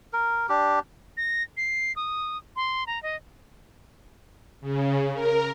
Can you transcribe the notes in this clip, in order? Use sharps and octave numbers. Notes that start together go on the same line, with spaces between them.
A#4
D4 G4
A#6
C7
D#6
C6
A#5
D#5
C#3
A#4